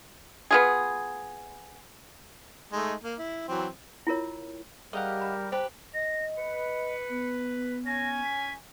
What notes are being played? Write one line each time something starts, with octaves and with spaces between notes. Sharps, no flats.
B3 F4 G#4
G#3 A3 D#4
A#3
E4
E3 F#3 C4
E4 F4 A#4 C#5
G3 G4 G#4 A#4 D#5 F5 F#5
A#5 B5
G4 B4 C5 A5
D#5 A#6
B4 C#7
B3
C#4 G#5 A#6
B6